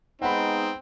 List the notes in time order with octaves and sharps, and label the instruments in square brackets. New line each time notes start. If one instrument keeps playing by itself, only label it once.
[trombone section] G#3 B3 D#4 [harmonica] C4 [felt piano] F#5 B5